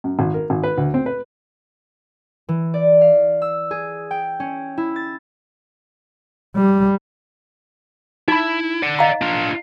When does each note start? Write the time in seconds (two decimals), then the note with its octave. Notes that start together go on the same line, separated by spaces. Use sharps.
0.04 F#2
0.19 G#1
0.34 A#4
0.50 G#1
0.63 B4
0.78 D2
0.94 C4
1.06 B4
2.49 E3
2.74 D5
3.01 F5
3.42 E6
3.71 G#4
4.11 G5
4.40 C#4
4.77 E4
4.96 A6
6.56 G3
8.28 D#4 E4 B5
8.82 D5 F#5
8.99 D#5 F5 A#5
9.22 D4 F4